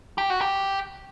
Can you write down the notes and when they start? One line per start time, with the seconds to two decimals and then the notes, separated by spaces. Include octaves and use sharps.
0.18 G4
0.30 F#4
0.41 G4